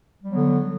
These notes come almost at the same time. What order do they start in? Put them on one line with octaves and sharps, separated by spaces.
G3 F#3 B3 D3